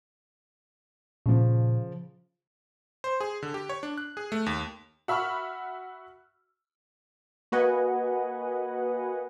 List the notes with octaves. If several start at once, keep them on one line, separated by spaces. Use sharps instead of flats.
A#2 C#3 F3
C5
G#4
D3
G4
C#5
D4
F#6
G#4
A3
D#2
F#4 E5 B5 C#6 F6
A#3 F#4 B4 D#5 F#5 G#5